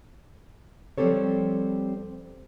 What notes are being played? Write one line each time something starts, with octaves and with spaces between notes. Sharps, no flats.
F3 G3 C4 G4 A4 C#5